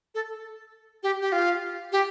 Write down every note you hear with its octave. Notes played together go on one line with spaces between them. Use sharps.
A4
G4
G4
F4
G4